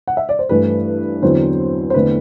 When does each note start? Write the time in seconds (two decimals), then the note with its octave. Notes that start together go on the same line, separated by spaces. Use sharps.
0.07 F#5
0.17 E5
0.29 D5
0.39 C5
0.49 G2 E3 A3 E4 B4
1.22 E2 D3 F#3 C4 E4 C5
1.90 C5
1.94 E2 D3 A3 C4 E4 B4